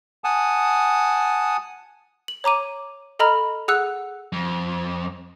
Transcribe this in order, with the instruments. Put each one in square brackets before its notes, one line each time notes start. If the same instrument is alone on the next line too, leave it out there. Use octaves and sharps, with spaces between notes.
[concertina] F#5 G#5 A5 D#6
[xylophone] F#7
C#5 A#5 D6 D#7
A4 D#5 A#5 B5 F6
G#4 F#5 E6 F#6
[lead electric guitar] F2